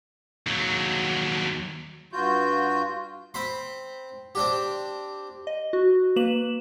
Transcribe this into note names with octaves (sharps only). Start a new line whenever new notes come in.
D#2 F#3
G2 F4 F#4 G6
C4 B5 C6
C4 D4 G4
D#5
F#4
A#3 B4 E7 F#7